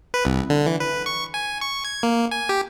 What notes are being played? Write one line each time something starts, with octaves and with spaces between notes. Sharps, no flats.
B4
C2
D3
E3
B4
C#6
G#5
C#6
G#6
A#3
G#5
G4